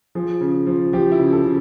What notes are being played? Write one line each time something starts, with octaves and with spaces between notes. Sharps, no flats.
F3 G#4
C#3
F3
F3 G4
E4
C#3
A4
C#3